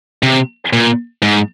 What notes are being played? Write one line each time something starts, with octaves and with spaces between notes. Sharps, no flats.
C3
A#2
G#2